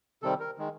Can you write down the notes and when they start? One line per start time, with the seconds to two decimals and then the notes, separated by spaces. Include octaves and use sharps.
0.23 C3 D#3 G3 C4 A4
0.40 A#4
0.58 D#3 G#3